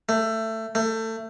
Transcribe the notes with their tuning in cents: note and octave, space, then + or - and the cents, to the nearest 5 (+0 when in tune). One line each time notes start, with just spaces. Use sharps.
A3 +20
A3 +25